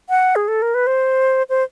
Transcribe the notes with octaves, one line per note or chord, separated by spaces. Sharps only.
F#5
G#4
A4
A#4
B4
C5
C5